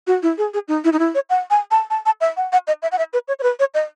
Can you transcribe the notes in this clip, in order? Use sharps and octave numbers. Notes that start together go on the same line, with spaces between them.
F#4
E4
G#4
G#4
D#4
E4
D#4
E4
C#5
F#5
G#5
A5
A5
A5
E5
F#5
F#5
D#5
E5
F#5
E5
B4
C#5
C#5
B4
C#5
D#5